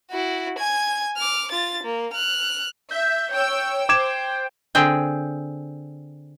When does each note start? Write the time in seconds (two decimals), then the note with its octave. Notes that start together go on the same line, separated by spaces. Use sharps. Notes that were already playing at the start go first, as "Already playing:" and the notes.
0.11 E4 F#4
0.59 G#5 G#6
1.17 D6 F6
1.51 F4 A6
1.84 A#3
2.14 F6 F#6
2.91 E5 G6
3.32 C#5 G5 E6
3.89 C5 G5 D6 G#6 E7
4.75 D3 C4 G#4 G5